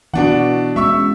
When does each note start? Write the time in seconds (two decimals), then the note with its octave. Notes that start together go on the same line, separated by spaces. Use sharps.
0.14 B2 E3 B3 D4 F#4 F#5
0.76 G#3 C#4 E5 C#6 E6